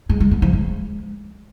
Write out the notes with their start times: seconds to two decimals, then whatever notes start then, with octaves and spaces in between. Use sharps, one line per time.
0.09 G#3
0.20 G#3
0.31 B3
0.42 F3
0.53 G#3